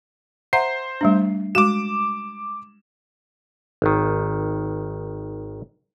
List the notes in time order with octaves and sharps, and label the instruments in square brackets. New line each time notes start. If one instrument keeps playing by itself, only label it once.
[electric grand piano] C5 C7 [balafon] E5 F#5 A#5
[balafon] G3 A3 D4
[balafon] G#3 F#4 [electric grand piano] D6 E7
[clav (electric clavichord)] G#1 D#3